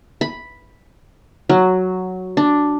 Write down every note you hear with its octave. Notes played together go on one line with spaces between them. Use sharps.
B5
F#3
D4